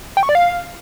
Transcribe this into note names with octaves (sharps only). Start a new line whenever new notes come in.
G5
C#6
D5
F5